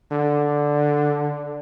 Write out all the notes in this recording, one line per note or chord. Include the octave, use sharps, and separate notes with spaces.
D3